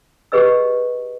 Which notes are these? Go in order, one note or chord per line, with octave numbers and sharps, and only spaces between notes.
G4 G#4 B4 D#5 E6